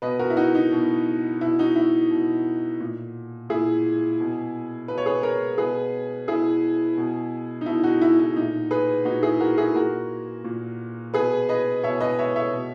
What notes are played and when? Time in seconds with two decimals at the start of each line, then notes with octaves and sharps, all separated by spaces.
0.02 B2 B4 D#5
0.19 F#4 A#4
0.30 E4
0.37 D#4 F#4
0.55 D#4
0.72 B2
1.41 B2 E4
1.59 D#4 F#4
1.76 E4
2.11 B2
2.81 A#2
3.49 A#2 E4 G#4
4.20 B2
4.88 B2 B4
4.98 C#5
5.06 G#4 B4
5.23 A#4 C#5
5.58 B2 G#4 B4
6.28 B2 E4 G#4
6.97 B2
7.61 D#4
7.66 B2 E4
7.83 D#4 F#4
8.01 E4
8.19 E4
8.36 A#2 D#4
8.71 G#4 B4
9.05 A#2 D#4 F#4
9.22 E4 G#4
9.40 F#4 A#4
9.57 E4 G#4
9.75 A#2 F#4 A#4
10.44 A#2
11.14 B2 G#4 B4
11.49 B4 D#5
11.83 B2 C#5 E5
12.00 B4 D#5
12.19 C#5 E5
12.36 C#5 E5
12.53 B2